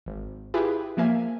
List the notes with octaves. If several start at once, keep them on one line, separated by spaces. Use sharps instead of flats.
G#1
E4 F4 G4 G#4 B4
F3 A#3 E5 G#5